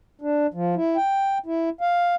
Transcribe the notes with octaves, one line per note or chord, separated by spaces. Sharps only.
D4
F3
E4
G5
E4
F5